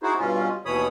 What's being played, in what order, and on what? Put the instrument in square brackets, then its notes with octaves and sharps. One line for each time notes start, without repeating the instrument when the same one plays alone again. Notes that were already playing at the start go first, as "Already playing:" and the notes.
[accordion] D#4 E4 F#4 G#4 C5
G2 B2 C#4 F4
D#2 B2 E3 C#5 B5 D#6